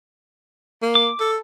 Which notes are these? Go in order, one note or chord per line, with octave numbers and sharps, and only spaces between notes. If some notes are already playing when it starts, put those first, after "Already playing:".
A#3
D6
A4